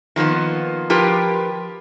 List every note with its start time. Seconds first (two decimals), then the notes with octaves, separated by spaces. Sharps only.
0.16 D#3 F3 A#3 B3
0.90 F3 F4 G4 A#4 B4